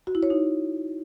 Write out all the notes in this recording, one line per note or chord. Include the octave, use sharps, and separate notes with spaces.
F#4
E4
C#5
D#4